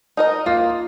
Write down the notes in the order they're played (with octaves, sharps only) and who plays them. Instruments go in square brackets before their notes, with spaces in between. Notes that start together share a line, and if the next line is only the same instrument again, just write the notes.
[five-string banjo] D#4 A#4 D#5
[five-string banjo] A#3 [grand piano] F4